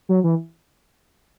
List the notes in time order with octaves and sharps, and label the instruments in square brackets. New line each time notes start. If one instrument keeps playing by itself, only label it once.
[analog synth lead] F#3
E3